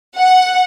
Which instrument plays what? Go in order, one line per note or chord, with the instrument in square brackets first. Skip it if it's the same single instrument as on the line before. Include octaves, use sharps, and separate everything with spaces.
[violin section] F#5